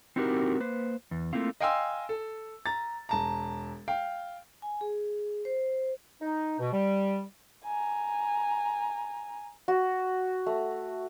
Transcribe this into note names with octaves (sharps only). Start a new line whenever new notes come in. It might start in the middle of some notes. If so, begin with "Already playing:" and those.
C4 D#4 E4 F#4 G4 A#4
A#3 B4 C5
E2
A3 A#3 C4 E4 F4
D#5 F5 G5 G#5 C6 E6
A4
A#5 A6
E1 A5 A#5
F5 G5
G#5
G#4
C5
D#4
B2
G3
G#5 A#5
F#4
A3